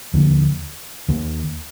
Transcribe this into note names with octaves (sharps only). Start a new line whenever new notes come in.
D#2 D3 F3 A#3
D#2 D#3 A#3